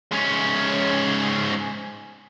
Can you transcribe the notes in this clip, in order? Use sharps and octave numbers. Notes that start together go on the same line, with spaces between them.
G#2 C#4